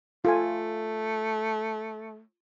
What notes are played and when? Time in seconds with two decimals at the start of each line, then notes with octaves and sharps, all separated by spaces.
0.25 A3 F4 A4 G#5